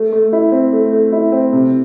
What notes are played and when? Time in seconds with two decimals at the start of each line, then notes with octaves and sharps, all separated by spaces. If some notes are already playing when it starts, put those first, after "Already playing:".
Already playing: A3
0.12 A3
0.33 E4
0.52 C4
0.73 A3
0.93 A3
1.12 E4
1.32 C4
1.53 C3